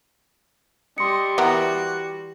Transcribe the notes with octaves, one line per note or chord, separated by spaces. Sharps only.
G3 D#5 C6 C#7
E3 B3 F#4 A#4